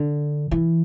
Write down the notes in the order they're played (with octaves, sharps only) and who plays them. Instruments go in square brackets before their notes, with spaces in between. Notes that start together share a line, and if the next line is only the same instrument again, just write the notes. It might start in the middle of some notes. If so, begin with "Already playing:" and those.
Already playing: [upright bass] D3
E3